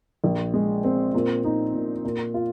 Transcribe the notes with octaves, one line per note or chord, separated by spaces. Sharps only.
A#1
G#3
C4
A#2
D#4
A#2
A#2
F4